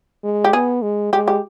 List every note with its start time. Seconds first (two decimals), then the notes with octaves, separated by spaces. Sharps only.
0.24 G#3
0.44 G4
0.53 B3 G#4
0.82 G#3
1.13 G#3 G4
1.28 G4